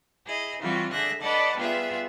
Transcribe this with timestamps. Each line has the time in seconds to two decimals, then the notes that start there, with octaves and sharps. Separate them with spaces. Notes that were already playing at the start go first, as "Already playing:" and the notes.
0.25 E4 G#4 D#5
0.60 E3 G3 C4 F4 F#4
0.92 D3 G#4 E5 F#6 A#6
1.21 B4 D5 D#5 F#5 A5
1.57 G3 B3 F4 G#4 E5